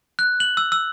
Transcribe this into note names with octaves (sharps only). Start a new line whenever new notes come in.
F#6
F#7
E6
E6